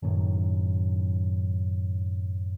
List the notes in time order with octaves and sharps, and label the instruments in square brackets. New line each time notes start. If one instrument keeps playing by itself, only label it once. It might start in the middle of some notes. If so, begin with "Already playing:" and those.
[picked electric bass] F#2 A2 D#3 F#3